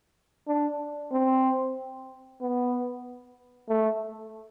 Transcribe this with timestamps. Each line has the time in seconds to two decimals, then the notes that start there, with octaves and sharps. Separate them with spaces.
0.48 D4
1.12 C4
2.41 B3
3.69 A3